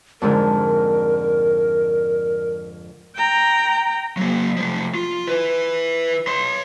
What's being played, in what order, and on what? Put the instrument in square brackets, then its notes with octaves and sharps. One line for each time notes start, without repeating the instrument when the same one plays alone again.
[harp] F2 G#2 D3 [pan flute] A#4
[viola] G5 A#5
[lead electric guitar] F#3 A#3
F3 A3
F4
E4 B4
C#5 C6